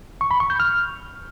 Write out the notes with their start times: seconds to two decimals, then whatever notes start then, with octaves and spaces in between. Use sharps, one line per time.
0.21 C#6
0.31 B5
0.40 C#6
0.50 G6
0.60 F6